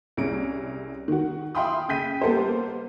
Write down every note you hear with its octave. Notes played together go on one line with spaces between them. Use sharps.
C2 C#4 G#4 D7
D#3 F#4
E5 F5 G5 B5 C6 D#6
C#3 G5 G6 B6 D#7
G3 A#3 B3 A4 C5